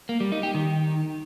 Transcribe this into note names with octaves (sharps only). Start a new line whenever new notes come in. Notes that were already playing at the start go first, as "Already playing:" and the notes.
A#3
G3
D#4
G4
D#3